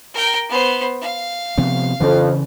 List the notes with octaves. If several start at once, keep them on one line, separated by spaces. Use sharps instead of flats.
A#4 G5
B3 C5
F5
C3 F3 B3
F2 C#3 E3